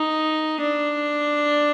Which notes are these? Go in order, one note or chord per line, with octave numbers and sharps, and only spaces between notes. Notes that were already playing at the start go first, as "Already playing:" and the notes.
Already playing: D#4
D4